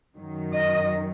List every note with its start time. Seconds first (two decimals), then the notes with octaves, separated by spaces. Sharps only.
0.15 F#2 D#3 F#3
0.53 D#5